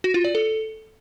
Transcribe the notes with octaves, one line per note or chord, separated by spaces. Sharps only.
F#4
F4
D5
A4